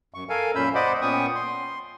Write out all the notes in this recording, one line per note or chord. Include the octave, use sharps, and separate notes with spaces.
F#2 C#6
A4 A#4 F5 G#5
F#2 A#2 C#4 B5 E6 G6
C5 D5 D#5 F#5 B5 D6
A#2 B3 C#4 G5 C#6 D#6
C6